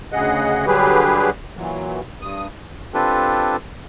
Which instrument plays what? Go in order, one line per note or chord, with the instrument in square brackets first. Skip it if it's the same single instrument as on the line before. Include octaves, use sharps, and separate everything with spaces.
[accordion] D2 C#3 G#4 D#5 F#5
D3 F#3 G3 G4 G#4 B4
A#2 E3 F#3
G2 D#6
[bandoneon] C4 D4 F4 G4 A4 B4